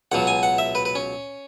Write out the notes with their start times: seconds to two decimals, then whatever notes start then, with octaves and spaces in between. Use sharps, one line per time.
0.12 C#2 B2 F#3 F#5
0.27 G#5
0.43 F#5
0.58 E5
0.75 B4
0.85 B4
0.95 C#4